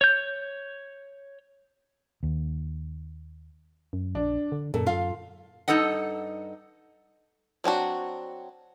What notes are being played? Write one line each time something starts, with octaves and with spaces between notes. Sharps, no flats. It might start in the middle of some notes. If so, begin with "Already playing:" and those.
C#5 G6
D#2
F#2
A#1 D4
D3
F#2 A#2 A4
F4 F5
G2 D#4 A4 D#5 F#5
F#3 C4 D4 F#4